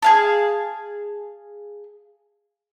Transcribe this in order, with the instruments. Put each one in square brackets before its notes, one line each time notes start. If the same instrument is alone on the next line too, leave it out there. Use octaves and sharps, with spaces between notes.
[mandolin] G#4 F5 A5